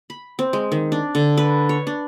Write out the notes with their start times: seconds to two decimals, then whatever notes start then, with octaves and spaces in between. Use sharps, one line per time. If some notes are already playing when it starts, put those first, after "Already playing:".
0.10 B5
0.39 C4
0.53 G#3
0.72 D#3
0.92 D4
1.15 D3
1.37 B4
1.69 C#5
1.87 D4